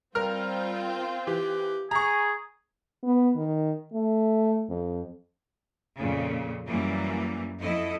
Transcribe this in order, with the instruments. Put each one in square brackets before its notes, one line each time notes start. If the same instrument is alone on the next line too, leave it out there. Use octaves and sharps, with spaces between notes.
[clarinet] G3 [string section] C4 F4 G5 [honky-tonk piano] A#4 F6
[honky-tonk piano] E3 [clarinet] G4
[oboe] G#4 [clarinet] G#5 [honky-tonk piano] A#5 C#6
[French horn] B3
D#3
A3
F2
[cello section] F2 A#2 C#3
F#2 E3 G3 A#3
F2 E4 A4 D#5